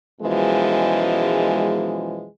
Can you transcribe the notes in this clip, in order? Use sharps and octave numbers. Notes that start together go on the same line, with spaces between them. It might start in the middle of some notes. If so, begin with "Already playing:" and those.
F#2 B2 E3 F3 G#3